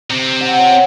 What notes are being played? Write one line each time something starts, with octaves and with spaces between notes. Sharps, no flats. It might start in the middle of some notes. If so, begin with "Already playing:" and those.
C3 C4
F#5
C#5